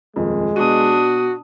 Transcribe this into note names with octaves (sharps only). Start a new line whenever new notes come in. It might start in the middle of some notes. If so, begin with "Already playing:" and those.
D#1 F2 G#3
B2 D4 F#4 D#6 D#7